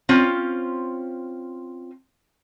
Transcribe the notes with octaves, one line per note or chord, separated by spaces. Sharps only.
C4 C#4 F4